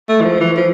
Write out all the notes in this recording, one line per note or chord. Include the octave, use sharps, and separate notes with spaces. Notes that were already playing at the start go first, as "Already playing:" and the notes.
A3
E3
F3
E3
F3